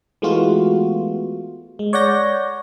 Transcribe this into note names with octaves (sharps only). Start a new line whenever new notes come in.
E3 G#3 A3 B3 F4 F#4
G#3
C#5 D5 F#5 G6 A#6